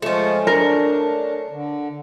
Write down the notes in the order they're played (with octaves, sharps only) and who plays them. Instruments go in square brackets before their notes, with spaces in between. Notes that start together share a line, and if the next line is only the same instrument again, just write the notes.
[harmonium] F3 G#3 F4 [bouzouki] A3 C#4
[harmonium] D4 [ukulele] A#4
[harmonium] D3